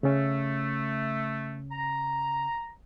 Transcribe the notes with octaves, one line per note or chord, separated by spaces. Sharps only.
C#3 A3 C#4
A#5